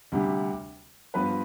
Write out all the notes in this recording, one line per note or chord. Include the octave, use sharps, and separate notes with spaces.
D2 C3 G3 D4 G4
G2 F3 B3 F4 B4